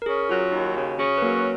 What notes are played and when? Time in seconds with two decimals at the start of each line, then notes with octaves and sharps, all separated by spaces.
0.02 A#4
0.06 C#4 G#4
0.29 F#3 F4
0.52 D#2 D#4
0.75 C#3 F#4
0.99 C#4 G#4
1.17 B4
1.22 F#3 A#3 A#4